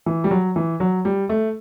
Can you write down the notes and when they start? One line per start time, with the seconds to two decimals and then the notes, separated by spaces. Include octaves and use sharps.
0.06 E3
0.24 G3
0.31 F#3
0.56 E3
0.80 F#3
1.05 G3
1.29 A3